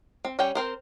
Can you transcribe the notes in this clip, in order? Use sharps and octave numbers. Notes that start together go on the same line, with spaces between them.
C4
G3 C#4 C#5 G5
C4 A#4 C5